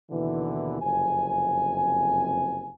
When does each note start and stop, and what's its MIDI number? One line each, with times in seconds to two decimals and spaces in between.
0.10 0.80 39
0.10 0.80 47
0.10 0.80 50
0.10 0.80 52
0.80 2.71 30
0.80 2.71 41
0.80 2.71 48
0.80 2.71 80